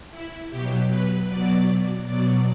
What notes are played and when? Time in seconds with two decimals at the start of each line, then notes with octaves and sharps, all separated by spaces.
0.11 E4
0.50 B2 F#3 G4
0.90 B4
1.29 B2 F#3 D5
2.07 B2 F#3 D5